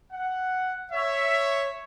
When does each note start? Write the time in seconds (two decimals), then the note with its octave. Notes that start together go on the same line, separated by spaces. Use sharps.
0.13 F#5
0.92 C#5 E5